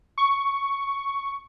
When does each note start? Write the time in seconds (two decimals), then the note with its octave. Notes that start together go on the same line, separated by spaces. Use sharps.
0.18 C#6